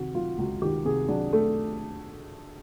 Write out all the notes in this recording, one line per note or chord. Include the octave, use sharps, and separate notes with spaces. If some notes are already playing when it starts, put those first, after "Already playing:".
Already playing: C3 D#3 F#4
F#3 F4
C#2 F#4
D#3 G4
C3 G#4
F#3 D4
A3